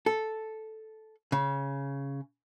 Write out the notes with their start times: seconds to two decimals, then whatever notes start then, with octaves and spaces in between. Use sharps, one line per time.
0.06 A4
1.32 C#3